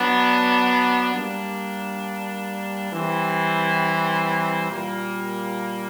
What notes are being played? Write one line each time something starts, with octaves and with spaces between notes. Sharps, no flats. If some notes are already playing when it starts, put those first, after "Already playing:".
Already playing: F#3 B3 D4
G3 A#3 D4
E3 G3 C4
A#2 G3 A#3